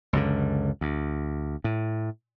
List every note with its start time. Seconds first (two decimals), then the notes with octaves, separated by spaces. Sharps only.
0.13 C#2 F#2 D3
0.81 D2
1.64 A2